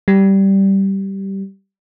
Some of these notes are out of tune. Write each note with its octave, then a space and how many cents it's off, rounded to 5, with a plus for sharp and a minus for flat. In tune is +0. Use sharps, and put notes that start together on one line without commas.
G3 -10